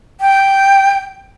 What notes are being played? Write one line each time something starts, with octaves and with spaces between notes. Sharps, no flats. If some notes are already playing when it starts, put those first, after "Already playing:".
G5